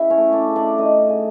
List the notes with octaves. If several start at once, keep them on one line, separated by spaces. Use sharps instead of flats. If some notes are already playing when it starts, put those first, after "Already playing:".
Already playing: C#3 E4 E5
C#4 C#5
A3
D4 D5
C#3
D4 D5
A3 D#4 D#5
C#3